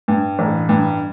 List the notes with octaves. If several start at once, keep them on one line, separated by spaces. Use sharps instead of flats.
G2
A1
G2